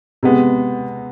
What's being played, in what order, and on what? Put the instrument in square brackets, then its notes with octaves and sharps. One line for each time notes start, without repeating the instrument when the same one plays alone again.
[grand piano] C3 G#3 B3